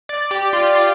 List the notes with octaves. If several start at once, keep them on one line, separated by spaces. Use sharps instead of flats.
D5
G4
F4
F4